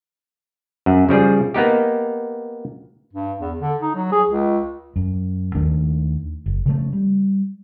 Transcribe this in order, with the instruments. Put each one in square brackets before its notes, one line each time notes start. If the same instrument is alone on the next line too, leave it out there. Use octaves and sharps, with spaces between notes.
[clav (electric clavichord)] F#2
C#3 F3 G3 G#4
A#3 B3 D#4 G4
[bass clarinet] G2
E2
D3
D#4
F#3
G#4
C#2
[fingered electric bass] F#2
D#2 D#3 A3 D4
F#1
C#3 F3 A3
G3